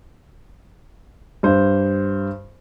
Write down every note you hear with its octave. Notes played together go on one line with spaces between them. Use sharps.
G2 C5